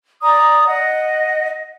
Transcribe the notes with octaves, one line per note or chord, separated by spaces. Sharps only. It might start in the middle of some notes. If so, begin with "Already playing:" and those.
D5 A#5 D#6
D#5 F#5